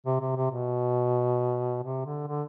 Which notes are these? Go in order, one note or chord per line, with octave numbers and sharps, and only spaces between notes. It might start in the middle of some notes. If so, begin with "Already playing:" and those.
C3
C3
C3
B2
C3
D3
D3